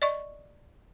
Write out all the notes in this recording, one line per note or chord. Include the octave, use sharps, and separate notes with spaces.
D5 D#5 C#6